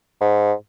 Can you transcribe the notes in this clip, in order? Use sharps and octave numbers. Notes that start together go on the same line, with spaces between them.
G#2